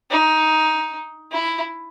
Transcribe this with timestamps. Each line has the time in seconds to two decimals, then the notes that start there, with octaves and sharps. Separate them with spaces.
0.11 D#4
1.32 E4